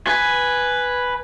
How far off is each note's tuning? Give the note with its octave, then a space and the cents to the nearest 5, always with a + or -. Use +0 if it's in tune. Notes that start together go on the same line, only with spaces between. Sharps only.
B4 +0 G#5 +0